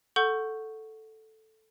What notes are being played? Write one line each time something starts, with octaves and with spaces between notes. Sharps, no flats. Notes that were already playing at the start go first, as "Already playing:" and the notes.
A4 F#5 C#6 G6